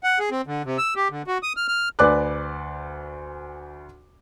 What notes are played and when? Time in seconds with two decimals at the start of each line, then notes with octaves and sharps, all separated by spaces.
0.03 F#5
0.19 G#4
0.31 C4
0.47 D3
0.65 C3
0.78 E6
0.96 G4
1.10 D3
1.27 F#4
1.43 D#6
1.57 F6
1.68 F6
1.99 D2 B4 D5 G#5 D6 F#6